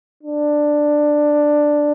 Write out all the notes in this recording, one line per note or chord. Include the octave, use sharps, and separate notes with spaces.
D4